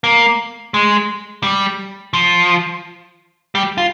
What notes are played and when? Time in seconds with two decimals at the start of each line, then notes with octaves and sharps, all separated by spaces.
0.04 A#3
0.74 G#3
1.44 G3
2.13 F3
3.55 G3
3.78 F4